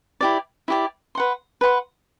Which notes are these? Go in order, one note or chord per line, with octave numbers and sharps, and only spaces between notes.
E4 G4 D5
E4 G4 D5
B4 F#5 C6
B4 F#5 C6